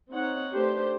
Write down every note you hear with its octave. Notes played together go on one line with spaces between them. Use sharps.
C4 D#4 C#5 F#5
A3 D4 G4 B4 C5